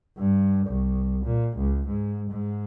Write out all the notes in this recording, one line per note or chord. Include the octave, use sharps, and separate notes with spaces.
G2
C2
A#2
C#2
G#2
G#2